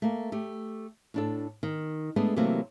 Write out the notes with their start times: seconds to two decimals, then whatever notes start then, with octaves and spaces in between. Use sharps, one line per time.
0.02 A3 A#3
0.32 A3 G4
1.14 A2 D4 A4
1.63 D#3
2.16 G#3 A3 B3 D4
2.36 C3 E3 F#3 A3 A#3 E4